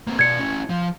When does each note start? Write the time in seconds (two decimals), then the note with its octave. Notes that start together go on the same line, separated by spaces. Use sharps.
0.07 A#3 C4
0.19 B2 D5 G#6 C#7
0.39 C#4 E4
0.70 F3